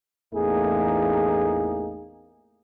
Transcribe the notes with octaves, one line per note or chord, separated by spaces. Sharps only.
A1 E2 A3 A#3 D#4 G#4